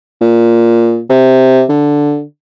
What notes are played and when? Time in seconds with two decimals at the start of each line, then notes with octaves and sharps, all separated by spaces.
0.21 A#2
1.10 C3
1.69 D3